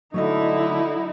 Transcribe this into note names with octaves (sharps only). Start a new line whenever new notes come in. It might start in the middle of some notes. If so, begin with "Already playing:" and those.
D3 F#3 A3 D#4 E4 D#5